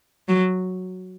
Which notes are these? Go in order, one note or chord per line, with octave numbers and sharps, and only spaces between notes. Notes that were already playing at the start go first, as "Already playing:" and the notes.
F#3